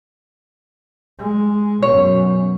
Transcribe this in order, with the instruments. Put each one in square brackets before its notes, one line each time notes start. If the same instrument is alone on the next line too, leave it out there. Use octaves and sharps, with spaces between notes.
[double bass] G#3
[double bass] F#2 B2 [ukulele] C#5